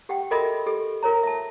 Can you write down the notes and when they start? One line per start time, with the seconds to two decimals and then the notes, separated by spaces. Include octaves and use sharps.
0.09 G4 F#5 G5
0.31 F#4 A4 A#4 D#5 E5 B5
0.66 G4 A4
1.03 F4 A#4 C#5 A#5
1.23 E5 A5